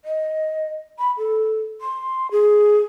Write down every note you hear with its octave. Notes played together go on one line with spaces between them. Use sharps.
D#5
B5
A4
C6
G#4